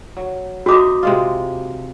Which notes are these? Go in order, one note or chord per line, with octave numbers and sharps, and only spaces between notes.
F#3
C4 D#4 F#4 E5 D6
C3 G#3 F4